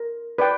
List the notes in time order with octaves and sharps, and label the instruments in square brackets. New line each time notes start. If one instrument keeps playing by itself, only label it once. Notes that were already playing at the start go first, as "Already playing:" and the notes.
Already playing: [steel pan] A#4
B4 D5 G5